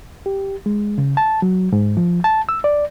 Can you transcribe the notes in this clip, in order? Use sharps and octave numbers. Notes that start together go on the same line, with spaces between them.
G4
G#3
C#3
A5
F#3
G#2
F3
A5
E6
D5